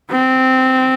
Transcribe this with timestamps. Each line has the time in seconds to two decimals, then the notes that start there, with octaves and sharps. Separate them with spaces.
0.10 C4